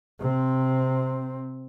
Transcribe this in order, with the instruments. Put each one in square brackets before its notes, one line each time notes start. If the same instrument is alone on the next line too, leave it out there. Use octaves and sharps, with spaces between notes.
[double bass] C3 C4